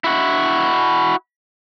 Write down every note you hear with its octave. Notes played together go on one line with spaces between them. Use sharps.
E4 F#4